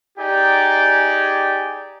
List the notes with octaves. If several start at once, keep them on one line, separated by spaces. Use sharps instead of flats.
D#4 G4 G#4 D5 G5 G#5